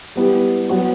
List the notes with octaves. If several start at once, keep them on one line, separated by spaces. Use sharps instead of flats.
G3 B3 E4 G4
F#3 B3 F#4